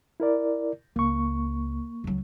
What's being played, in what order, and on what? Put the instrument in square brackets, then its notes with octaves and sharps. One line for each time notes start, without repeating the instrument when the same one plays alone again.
[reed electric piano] E4 A#4 D5
[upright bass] C#2 [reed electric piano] A#3 C#6
[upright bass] C#2 F#3